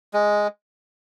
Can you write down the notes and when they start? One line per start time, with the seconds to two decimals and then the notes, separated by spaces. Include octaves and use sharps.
0.14 G#3